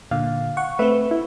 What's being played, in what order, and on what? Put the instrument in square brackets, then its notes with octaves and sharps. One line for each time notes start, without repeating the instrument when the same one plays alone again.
[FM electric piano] A#2 D3 [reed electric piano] F5
[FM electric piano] F#5 C#6
[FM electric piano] A3 C4 [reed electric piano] B4 E5
[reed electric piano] E4